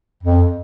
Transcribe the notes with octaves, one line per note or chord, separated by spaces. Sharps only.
F2